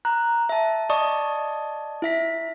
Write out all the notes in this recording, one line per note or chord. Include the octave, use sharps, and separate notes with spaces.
A#5 F#6
E5 A5
D5 D#5 A5 C#6 D#6
E4 E5 B6